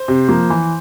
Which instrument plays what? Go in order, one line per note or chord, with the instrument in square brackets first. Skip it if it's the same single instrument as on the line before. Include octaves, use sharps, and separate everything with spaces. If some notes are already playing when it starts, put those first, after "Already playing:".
Already playing: [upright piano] C5
C3
F3 A#3
E3